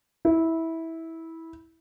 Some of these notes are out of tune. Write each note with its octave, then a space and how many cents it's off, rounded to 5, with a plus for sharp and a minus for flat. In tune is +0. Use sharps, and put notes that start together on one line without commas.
E4 -15